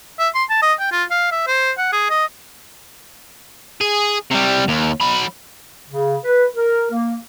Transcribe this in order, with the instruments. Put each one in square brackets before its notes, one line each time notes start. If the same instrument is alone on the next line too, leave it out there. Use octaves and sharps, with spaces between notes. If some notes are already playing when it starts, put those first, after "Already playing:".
[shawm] E5
C6
A5
D#5
G5
F4
F5
E5
C5
F#5
G#4
D#5
[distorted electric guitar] G#4
C3 G3
D#2
F#3 B5
[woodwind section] C#3
B4
A#4
A#3